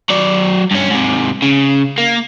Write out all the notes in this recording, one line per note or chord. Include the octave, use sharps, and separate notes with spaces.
F#3 D5
G2 C#4
G#2 C3
C#3
A#3